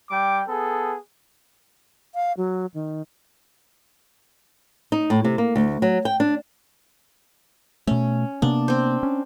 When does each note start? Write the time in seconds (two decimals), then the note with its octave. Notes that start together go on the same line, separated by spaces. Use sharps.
0.10 G3 G5 D6
0.48 B3 G#4 A4
2.15 F5
2.37 F#3
2.74 D#3
4.92 D#4
5.10 A2
5.25 C3
5.38 A#3
5.56 D2
5.82 F#3
6.05 G5
6.20 D4
7.87 B2 A3 C#4
8.42 C3 A#3 B3 D4
8.68 C4 C5
9.03 C#4